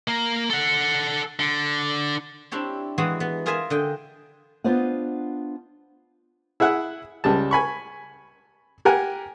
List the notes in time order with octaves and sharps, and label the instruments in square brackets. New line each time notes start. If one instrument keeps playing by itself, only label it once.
[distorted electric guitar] A#3
A4 F#5
D3
[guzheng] C4 D4 E4 G4 C#5
E3 G#3 B3 F#4 G#4
B3
F4 G#4 A#4 E5 G#5
D3 D#5 G5
[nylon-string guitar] B3 D4 F4 C5 D#5 F#5
[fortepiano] E4 G#4 E5 F#5
C#2 G3 A5
G#5 B5 C#6
G4 A#4 F#5 G#5